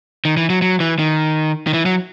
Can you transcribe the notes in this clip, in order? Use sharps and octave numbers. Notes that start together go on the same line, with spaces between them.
D#3
E3
F#3
F#3
E3
D#3
D#3
E3
F#3